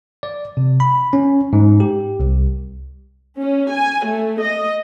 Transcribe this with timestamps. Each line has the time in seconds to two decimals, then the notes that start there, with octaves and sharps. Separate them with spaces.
0.23 D5
0.57 C3
0.80 B5
1.13 C#4
1.53 G#2
1.80 G4
2.20 C2
3.38 C#4
3.71 G#5
4.06 A3
4.41 D#5